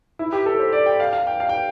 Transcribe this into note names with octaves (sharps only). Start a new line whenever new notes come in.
E4
G4
A4
C5
D5
G5
F5
F5
G5
F5
G5